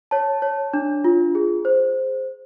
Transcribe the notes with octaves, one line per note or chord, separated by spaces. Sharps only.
C#5 A5
C#5
D4
F4
G#4
C5